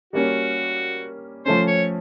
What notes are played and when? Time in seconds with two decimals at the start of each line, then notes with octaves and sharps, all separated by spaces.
0.13 G3 A#3 C#4 F#4
1.45 F3 A3 C#4 C5
1.67 C#5